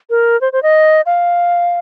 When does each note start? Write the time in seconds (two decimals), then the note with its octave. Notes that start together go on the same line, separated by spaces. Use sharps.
0.10 A#4
0.41 C5
0.53 C5
0.63 D#5
1.06 F5